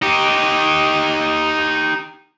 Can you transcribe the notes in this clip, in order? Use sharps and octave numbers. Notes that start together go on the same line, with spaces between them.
D#4 G4